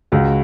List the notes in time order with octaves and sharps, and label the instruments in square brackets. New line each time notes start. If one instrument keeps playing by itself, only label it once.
[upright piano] C#2 F#4